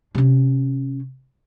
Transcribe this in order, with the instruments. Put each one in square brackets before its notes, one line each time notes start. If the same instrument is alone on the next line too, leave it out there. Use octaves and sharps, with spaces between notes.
[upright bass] C3 C#4